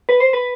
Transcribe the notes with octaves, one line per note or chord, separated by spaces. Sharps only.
B4
C5
B4